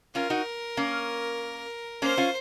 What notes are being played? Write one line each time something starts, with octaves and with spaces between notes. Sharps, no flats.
C#4 F4 A#4
D#4 F#4
A#3 C#4
A#3 C#4 C5
C#4 F4